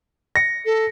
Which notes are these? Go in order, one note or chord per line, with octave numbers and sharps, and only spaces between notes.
A#6 C#7
A4